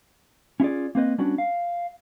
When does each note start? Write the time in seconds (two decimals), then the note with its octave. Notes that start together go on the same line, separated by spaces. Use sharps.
0.60 C#4 E4 F4 G#4 D5
0.95 A#3 C4 B4 D#5
1.18 G3 B3 C#4 D4 F#4
1.38 F5